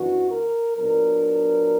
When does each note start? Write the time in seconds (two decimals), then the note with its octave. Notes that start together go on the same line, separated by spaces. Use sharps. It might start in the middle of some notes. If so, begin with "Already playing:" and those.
Already playing: F#2 E3 B3 D4 F#4
0.31 A#4
0.77 A#2 F#3 B3 D4 A#4